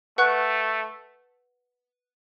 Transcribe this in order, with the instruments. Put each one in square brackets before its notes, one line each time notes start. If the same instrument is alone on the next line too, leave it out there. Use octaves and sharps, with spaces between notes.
[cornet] A3 [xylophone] B4 F#5 C#6 F#6